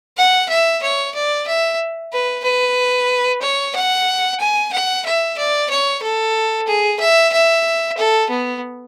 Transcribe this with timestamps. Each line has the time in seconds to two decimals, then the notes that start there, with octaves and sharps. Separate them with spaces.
0.17 F#5
0.49 E5
0.82 C#5
1.14 D5
1.47 E5
2.13 B4
2.44 B4
3.42 C#5
3.75 F#5
4.40 G#5
4.73 F#5
5.05 E5
5.37 D5
5.70 C#5
6.02 A4
6.67 G#4
7.00 E5
7.33 E5
7.97 A4
8.30 B3